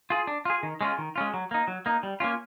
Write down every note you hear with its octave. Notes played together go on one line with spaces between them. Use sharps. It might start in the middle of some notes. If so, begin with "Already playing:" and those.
F4 G#4
D4
F4 G#4
D#3
G#3 C#4 F4
D#3
G#3 C#4 F4
F#3
A#3 D#4
F#3
A#3 D#4
G3
A#3 C#4 F4